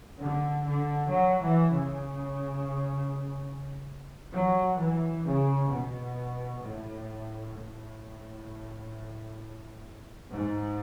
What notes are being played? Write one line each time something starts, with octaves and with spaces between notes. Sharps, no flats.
D3
D3
F#3
E3
C#3
F#3
E3
C#3
B2
A2
A2
G#2